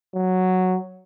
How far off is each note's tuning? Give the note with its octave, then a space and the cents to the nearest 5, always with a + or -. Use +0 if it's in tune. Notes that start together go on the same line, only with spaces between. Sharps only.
F#3 +0